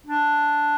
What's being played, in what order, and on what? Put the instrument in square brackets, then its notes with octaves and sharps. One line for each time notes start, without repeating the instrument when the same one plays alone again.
[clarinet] D4